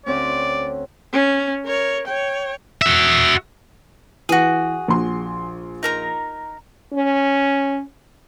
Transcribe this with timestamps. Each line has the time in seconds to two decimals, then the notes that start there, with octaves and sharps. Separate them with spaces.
0.06 D2 C4 C#4 D5
1.13 C#4
1.66 A#4 C#5
2.08 C#5 G5
2.82 F#4 E5
4.29 E3 F#4 G#4
4.88 A#1 C6
5.83 D#4 A#4 A#5
6.93 C#4